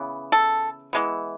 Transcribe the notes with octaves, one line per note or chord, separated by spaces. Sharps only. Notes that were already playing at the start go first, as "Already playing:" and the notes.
Already playing: C#3 E3 B3
A4
E3 G#3 B3